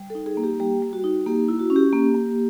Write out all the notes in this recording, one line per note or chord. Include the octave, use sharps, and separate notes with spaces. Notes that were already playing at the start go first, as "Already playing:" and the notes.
Already playing: G3
D#4 A4
G#4
A#3
G4
G3 G4
G3
F#4
D#4
A#3 G4
E4
F#4
C#4
G4
A#3
A#3